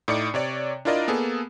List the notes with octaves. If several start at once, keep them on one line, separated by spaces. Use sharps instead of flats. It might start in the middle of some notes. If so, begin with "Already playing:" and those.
A2 D#4 D5 D6 C#7
C3 C#5 D5
D4 E4 F4 A#4 D5 D#5
A#3 B3 G#4 A4